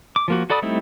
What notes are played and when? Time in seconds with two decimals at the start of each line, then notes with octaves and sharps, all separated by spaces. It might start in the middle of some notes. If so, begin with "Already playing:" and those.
0.16 D6
0.28 F3 A#3 F#4
0.50 F#4 A4 D5 B5 D#6
0.62 G3 A3 C4 D#4 E4